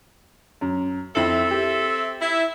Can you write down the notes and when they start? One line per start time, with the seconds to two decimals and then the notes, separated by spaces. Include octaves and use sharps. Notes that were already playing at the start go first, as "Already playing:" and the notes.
0.61 F#2
1.15 F2 C4 E4 A4 E5 F#7
1.51 G4
2.21 E4 E5